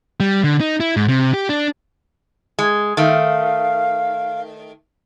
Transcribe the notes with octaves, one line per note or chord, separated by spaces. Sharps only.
G3
D3
D#4
E4
G#2
C3
G4
D4
G#3
D#3 A3 F5